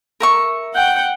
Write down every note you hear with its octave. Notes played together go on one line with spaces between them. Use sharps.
A#4 E5 C#6
F#5 G5 G6